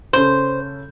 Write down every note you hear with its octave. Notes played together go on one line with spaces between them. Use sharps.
C#3 C#4 A4 C5